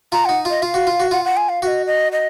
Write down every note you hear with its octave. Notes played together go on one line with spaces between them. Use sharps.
F4 A#5
D#4 F#5
F4 D#5
F4 F5
F#4
F4
F#4
F4 F#5
F#5
G#5
F5
F#4 D#5 F5
D#5
D#5